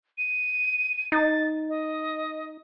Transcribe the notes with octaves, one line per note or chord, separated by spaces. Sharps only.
D#7
D#4 A6
D#5